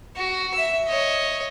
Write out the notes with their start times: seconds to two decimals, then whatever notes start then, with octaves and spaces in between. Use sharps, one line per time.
0.16 F#4
0.54 E5 E6
0.88 C#5 D#5